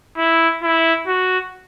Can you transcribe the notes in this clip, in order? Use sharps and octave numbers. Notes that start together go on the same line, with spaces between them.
E4
E4
F#4